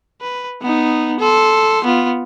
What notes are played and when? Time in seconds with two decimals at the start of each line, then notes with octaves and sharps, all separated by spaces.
0.21 B4
0.62 B3 D#4
1.20 A4 C6
1.84 B3 F4